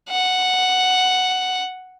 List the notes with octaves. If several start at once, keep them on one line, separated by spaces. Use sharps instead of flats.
F#5